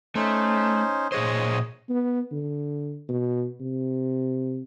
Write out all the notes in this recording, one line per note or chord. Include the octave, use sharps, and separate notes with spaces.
A3 C#4 D#4 C5
A#2 G#4 C5 C#5 D#5 D#6
B3
D3
B2
C3